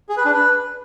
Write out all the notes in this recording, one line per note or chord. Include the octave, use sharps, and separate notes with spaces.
G#4
B4
D4
B4